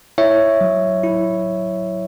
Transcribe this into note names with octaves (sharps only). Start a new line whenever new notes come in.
E4 C#5 E5
F#3
E4